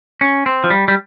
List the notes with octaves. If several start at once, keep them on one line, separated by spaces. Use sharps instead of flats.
C#4
C4
F3
G3
G3